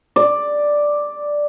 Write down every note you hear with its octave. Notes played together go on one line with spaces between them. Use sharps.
D5